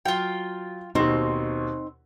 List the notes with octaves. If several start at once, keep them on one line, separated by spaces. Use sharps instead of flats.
F#3 F4 G5
D#2 B2 C4 D#4